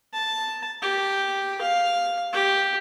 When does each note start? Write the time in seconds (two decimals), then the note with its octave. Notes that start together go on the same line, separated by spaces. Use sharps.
0.14 A5
0.82 G4
1.61 F5
2.33 G4